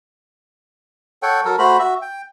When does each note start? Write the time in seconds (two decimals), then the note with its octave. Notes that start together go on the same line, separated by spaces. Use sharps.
1.23 A4 C#5 F#5 G5
1.45 F#3 A4 A#4
1.59 A3 F#4 C5 B5
1.79 F#4 E5
2.02 G5